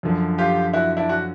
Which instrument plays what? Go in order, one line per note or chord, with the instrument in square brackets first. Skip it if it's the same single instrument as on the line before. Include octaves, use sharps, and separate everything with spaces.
[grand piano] F#2 D3 F3
[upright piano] F4 G4
E4 F#4
D4 E4
F#4